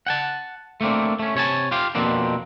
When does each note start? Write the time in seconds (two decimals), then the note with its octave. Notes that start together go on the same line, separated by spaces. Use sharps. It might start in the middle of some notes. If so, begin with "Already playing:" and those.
0.07 F#5 G5 A5
0.81 A3 A#3 C4 D4
1.19 A3 C#4
1.35 C3 C#5 G#5 A5
1.71 F4 G4 F5
1.95 F2 B2 F3 A#3 C4 D4